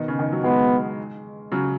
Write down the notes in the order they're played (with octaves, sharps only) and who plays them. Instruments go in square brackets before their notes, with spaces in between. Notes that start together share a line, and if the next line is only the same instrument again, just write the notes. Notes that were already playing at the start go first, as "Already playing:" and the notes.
Already playing: [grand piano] B2 D#3
C#3
D#3
F#3
[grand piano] D#3 G#3 [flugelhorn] B3
[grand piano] C#3 F#3